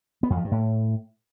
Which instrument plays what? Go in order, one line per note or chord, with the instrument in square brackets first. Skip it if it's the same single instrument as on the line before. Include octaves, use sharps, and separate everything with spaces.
[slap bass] B3
F2
F3
G2
A2